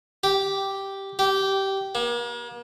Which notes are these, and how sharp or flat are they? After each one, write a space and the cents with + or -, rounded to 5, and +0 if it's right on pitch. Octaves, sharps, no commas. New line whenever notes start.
G4 -5
G4 -15
A#3 +40